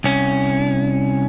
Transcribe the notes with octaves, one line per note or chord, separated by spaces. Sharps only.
C2 C#4